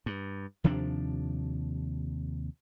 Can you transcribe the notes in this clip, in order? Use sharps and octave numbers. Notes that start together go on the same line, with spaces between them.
G2
D#2 C3 F3 D4